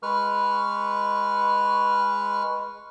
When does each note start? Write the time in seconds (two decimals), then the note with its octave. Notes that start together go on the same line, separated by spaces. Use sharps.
0.03 G#3 B4 C#6 F6